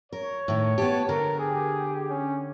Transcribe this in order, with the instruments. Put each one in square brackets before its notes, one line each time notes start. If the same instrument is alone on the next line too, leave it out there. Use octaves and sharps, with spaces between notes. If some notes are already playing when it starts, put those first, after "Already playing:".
[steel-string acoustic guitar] A#4 [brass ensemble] C#5
[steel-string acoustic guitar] A2 D#3
[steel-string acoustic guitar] B3 G4 [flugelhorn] A5
[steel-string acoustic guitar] D3 [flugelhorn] A#4
[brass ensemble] G4 [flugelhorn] G#4
[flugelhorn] C#4